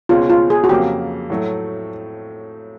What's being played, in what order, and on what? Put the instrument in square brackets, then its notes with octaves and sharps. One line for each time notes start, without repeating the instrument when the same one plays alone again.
[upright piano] C#2 B2 G#3 C#4 [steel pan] F4
[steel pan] F4
G#4
F#4
[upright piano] F2 C#3 F#3 A#3 [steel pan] G4
[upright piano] A2 F#3 A3